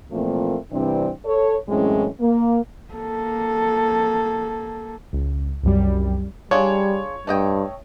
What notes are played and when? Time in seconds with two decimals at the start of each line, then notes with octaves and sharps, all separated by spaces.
0.12 A#2 E3 F3 A3 A#3 C4
0.73 G2 C3 E3 C4 D4
1.26 A4 C#5
1.69 F#2 A2 E3 G#3 C4 C#4
2.21 A#3
2.94 A#3 A4
5.13 C#2
5.63 C2 F#2 G3
6.51 G3 D4 F4 G#4 C#5
7.27 G2 A3 D#5 G5